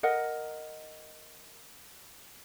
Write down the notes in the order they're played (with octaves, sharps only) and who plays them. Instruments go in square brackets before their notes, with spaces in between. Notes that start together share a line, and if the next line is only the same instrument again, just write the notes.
[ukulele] A#4 D#5 F#5